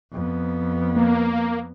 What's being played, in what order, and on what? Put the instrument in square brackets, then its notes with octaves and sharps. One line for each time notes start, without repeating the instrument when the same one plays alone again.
[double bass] F2 B3
[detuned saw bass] A#3